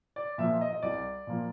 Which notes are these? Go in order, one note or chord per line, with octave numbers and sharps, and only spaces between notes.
D5
A#2 F3 A#3 E5
D#5
D#5
C2 D5
A#2 F3 A#3